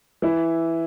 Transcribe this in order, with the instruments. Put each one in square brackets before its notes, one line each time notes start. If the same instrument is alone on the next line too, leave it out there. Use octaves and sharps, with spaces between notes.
[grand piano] E3 E4